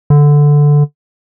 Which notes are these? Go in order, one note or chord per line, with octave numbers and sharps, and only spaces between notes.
D3